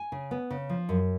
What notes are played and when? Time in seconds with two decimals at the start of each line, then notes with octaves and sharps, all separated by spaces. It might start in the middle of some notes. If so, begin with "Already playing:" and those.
Already playing: G#5
0.12 C#3
0.31 B3
0.50 C#3
0.69 F3
0.89 F#2